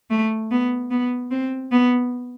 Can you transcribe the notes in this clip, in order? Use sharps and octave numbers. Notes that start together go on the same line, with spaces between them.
A3
B3
B3
C4
B3